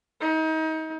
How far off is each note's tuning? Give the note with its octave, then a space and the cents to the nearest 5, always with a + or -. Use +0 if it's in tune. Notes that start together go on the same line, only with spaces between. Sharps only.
D#4 +30